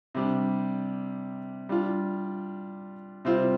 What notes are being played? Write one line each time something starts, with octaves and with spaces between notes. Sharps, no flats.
C3 G3 D4
G3 D4 F4
C3 G3 C4 F4